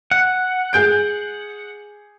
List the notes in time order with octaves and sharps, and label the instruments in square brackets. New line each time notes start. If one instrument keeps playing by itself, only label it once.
[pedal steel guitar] F#5
[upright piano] G#4 G6 D7